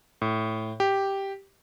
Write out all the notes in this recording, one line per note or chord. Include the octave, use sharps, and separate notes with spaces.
A2
G4